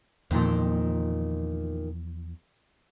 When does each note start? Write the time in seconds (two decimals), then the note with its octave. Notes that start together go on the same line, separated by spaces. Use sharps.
0.31 E2 A#2 D#3 F3